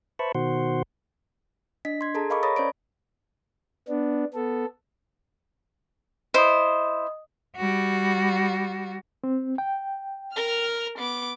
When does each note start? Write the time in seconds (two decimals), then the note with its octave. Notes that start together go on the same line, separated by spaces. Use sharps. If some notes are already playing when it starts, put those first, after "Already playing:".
0.19 B4 C5 E5 A5 B5 C#6
0.35 B2 D#3 F#4 C5 F#5 C6
1.85 D4 D#5 B6
2.01 C6 G#6
2.15 G#4 A4 A5 A#5
2.30 A#4 D#5 F5 B5 C#6 D6
2.43 C#5 A#5 B5 D#6 A6 A#6
2.56 C#4 C5 D5 D7
3.89 B3 D4
4.34 B3 A4
6.34 E4 C5 D#5 D#6
7.57 G3 F#4
9.24 C4
9.58 G5
10.32 A#4 F6
10.98 B3 D6